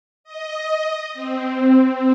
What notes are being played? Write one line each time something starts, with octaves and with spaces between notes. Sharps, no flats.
D#5
C4